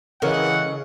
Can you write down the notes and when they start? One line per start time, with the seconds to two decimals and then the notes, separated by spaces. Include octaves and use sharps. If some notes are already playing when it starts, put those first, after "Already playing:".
0.22 C#3 E3 G#3 A4 A#4 C#5 D#5 F#5